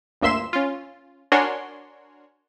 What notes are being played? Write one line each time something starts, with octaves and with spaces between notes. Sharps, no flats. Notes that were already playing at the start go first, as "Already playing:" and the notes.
G1 D2 A#3 E5 C6 E7
C#4 F4
D4 F#4 A#4 C#5 G#5 C6